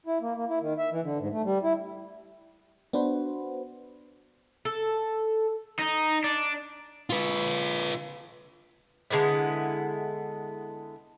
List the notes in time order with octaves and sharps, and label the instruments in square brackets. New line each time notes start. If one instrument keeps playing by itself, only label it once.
[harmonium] E4
A#3
A#3
E4
D#3
E5
E3
D3
G#2
A3
G3
E4
[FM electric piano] B3 D4 F#4 B4 C5
[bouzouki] A4
[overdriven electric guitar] D#4
D4
[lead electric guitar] F4 B4
[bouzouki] D3 G#3 B3 E4